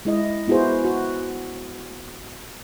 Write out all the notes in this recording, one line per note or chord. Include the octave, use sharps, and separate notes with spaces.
G#3 E4 D#5
B3 E4 F#4 G#4 C5
F#4